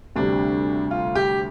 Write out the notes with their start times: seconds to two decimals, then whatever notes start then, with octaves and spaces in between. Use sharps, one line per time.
0.16 D2 C3 G3 D4
0.91 F4
1.15 G4